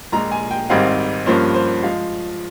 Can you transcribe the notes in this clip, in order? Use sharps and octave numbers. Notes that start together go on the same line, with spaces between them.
A#1 A#2 G#3 A#5
G#5
G5
G#1 G#2 G3 C4 D#4 F5
G2 F3 A#3 C#4 C5
C5
F3 G#3 F5